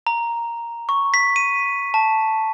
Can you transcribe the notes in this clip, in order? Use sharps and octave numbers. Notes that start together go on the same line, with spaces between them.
A#5
C#6
B6
D#7
A5